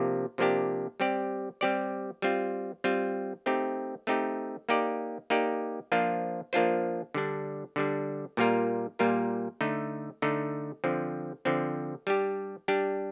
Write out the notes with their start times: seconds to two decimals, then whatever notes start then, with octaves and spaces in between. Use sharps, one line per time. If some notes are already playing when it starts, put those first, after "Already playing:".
Already playing: C3 F3 A#3 D4 G4
0.38 C3 F3 A#3 D4 G4
1.00 G3 C4 G4 D5
1.61 G3 C4 G4 D5
2.22 G3 C4 F4
2.84 G3 C4 F4
3.46 A3 C4 D#4 G4
4.07 A3 C4 D#4 G4
4.69 A#3 D#4 G4 D5
5.30 A#3 D#4 G4 D5
5.92 F3 A#3 D4 F4 C5
6.53 F3 A#3 D4 F4 C5
7.14 D3 G3 D4
7.76 D3 G3 D4
8.37 A#2 G3 A#3 F4 A#4
8.99 A#2 G3 A#3 F4 A#4
9.61 D3 A3 D#4
10.22 D3 A3 D#4
10.84 D3 F3 C4
11.45 D3 F3 C4
12.07 G3 D4 G4
12.68 G3 D4 G4